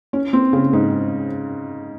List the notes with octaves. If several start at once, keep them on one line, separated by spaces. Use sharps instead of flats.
C#4
C4
C#3
G#2